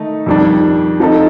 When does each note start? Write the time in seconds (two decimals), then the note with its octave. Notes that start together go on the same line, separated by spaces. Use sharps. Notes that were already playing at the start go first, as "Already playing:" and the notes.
Already playing: D#3 A3 D#4
0.26 F2 D#3 G3 D4
1.00 F3 C4 D#4 A4